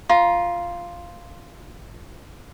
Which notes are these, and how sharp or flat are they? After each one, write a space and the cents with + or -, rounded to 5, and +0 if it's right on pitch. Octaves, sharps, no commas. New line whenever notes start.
F4 -5 A#5 +30